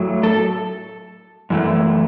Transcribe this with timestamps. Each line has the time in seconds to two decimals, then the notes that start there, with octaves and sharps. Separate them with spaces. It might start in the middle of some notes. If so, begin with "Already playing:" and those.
Already playing: A2 F#3 A3
0.23 A4
1.50 F#2 E3 A3